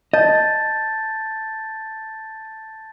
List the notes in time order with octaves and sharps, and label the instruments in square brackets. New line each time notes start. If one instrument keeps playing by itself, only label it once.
[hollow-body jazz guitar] D#5 [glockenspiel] A5 G6 A6